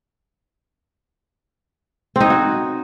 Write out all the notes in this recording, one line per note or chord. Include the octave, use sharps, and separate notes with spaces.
C4 D#4 F#4 C#5